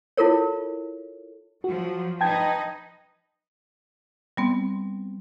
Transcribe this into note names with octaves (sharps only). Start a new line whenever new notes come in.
E4 F4 A4 A#4 C#5
F3 F#3 F#4
D#4 B4 D#5 G5 A5 G#6
G3 B3 C4